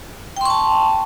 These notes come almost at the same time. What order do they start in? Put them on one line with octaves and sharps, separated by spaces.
G5 C6 C#6 A5